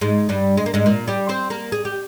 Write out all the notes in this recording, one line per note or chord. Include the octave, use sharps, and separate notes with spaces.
G#2 G#3
G2 G3
G#3
A#3
G#2 G#3
A#2 A#3
G3 G4
C4 C5
A#3 A#4
G#4
G4